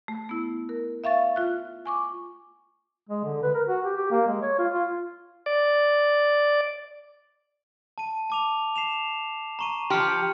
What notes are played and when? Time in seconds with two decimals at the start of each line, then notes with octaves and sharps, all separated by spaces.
0.08 A3
0.29 B3 E4
0.69 A#4
1.04 E5 F5 C#6 A6
1.36 F4 F#6
1.86 G#5 C#6 D6
3.09 G#3
3.25 D3
3.43 B4
3.54 A#4
3.68 F#4
3.85 G4
3.97 G4
4.11 A#3
4.27 G#3
4.42 C#5
4.58 F4
4.73 F4
5.46 D5
7.98 A5 D#7
8.30 A5 D6 F7
8.76 C7 E7 F7
9.59 A#5 C#6 D#7
9.90 F3 G4 C6 F6 C#7